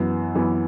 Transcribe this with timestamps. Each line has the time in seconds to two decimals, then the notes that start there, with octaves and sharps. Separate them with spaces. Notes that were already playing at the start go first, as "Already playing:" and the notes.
Already playing: F#2 E3 B3
0.35 F#2 E3 B3